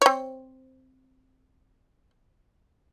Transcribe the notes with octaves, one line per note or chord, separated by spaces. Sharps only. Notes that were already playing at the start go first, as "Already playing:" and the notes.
C4 C#5